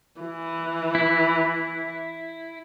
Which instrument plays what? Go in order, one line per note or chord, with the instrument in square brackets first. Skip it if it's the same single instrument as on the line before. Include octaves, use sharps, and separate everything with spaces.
[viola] E3
[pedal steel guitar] E4